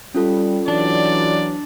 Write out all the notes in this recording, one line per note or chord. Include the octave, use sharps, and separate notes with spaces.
G3 C#4 F4 A4
E3 F#3 D4 D5